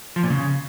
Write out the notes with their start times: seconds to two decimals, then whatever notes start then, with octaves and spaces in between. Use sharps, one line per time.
0.16 F3
0.23 A#2
0.30 C#3